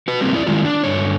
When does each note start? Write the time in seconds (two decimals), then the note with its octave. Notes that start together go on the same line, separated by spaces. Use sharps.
0.08 F#4 B4
0.20 F#3 G3 A3 A#3 C4
0.34 E4 D5
0.46 D#3 G#3 E4 F4
0.65 D4
0.84 G2 D3 C#5